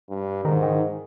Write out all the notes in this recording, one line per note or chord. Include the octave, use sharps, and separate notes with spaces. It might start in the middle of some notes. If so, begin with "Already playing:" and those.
G2
G#2 D#3
D#3